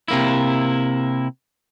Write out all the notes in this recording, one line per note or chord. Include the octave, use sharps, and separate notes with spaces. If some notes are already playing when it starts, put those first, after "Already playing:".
C3 A#3 E4